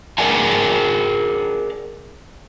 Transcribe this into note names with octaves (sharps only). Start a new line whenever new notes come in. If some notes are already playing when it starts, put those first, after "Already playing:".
G#4 A#4 D5 F#5 G#5 A5